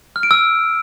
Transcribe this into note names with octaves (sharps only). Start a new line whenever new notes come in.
F6
D7
E6